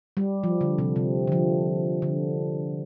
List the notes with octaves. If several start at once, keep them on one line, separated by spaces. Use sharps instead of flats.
G3
F3
D3
C3
C3
D3
F3
D3